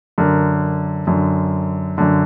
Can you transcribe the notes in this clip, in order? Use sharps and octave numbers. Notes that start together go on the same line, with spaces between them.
F#2 D3 A#4
F#2 D3
F#2 D3